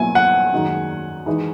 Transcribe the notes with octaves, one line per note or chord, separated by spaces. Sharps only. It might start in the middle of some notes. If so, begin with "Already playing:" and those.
Already playing: B2 F#3 A#3 E4 G#5
F#5
F#2 D#3 G#3 D#4 F#4
E3 G#3 D#4